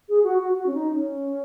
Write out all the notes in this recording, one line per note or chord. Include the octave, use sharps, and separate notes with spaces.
G#4
F#4
F#4
F#4
C#4
D#4
C#4